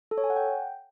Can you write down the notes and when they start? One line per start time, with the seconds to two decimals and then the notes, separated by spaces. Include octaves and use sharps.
0.11 A4
0.18 C#5
0.24 G#5
0.30 F#5
0.36 G5